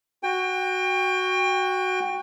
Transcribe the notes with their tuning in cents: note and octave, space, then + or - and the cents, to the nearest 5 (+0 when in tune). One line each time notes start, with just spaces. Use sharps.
F#4 +0 G5 +30